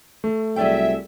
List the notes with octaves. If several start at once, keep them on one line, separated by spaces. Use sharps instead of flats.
A3
C2 F#3 G#4 D5 E5 G5